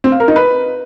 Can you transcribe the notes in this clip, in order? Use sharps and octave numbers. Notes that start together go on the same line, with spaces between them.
C4
F5
A#4
D#4
B4